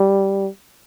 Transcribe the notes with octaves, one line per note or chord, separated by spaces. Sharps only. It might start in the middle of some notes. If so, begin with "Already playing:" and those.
Already playing: G3